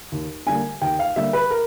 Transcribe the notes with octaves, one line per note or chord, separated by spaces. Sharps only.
D#2
D3 G3 A#3 G#5
D#2 G5
F5
D3 G3 A#3 E5
B4
A#4